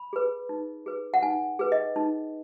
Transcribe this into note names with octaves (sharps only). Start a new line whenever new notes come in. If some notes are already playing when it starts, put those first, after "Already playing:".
Already playing: B5
G#4 B4
D#4
G#4 B4
F#5
D#4 G#5
G#4 B4
D#5
D#4